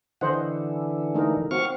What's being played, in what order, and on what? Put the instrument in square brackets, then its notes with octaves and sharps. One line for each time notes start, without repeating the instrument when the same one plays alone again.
[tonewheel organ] D3 E3 [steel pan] C5 D#5 F#5
[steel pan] A3 D#4 A#4
[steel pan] C4 F#4 [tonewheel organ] F5 C#6